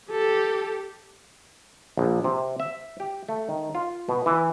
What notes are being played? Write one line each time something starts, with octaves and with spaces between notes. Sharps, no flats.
G4 A4
A#1
C3
E5
G4
A3
D#3
F4
B2
E3